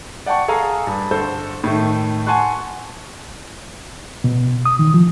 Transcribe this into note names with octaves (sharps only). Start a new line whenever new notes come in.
D5 F#5 G5 A5 C#6
G#4 A4 F5 G#5 A#5
G2
G1 A4 C5
A2 D#3 A3
F#5 G#5 A5 C6 C#6 F#6
B2
D#6
D#3
F3